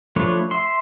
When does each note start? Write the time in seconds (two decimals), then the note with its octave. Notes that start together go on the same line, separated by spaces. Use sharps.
0.16 F3 A3 D4 B4 C#5
0.51 E5 C6